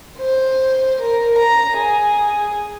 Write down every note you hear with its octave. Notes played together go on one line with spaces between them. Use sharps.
C5
A#4
A#5
G#4